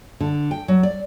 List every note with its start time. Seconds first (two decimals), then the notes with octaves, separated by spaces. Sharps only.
0.20 D3
0.51 G5
0.68 F#3
0.83 D5